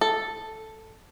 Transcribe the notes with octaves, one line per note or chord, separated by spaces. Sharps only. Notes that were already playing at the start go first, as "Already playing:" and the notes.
A4